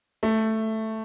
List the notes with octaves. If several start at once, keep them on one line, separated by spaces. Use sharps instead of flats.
A3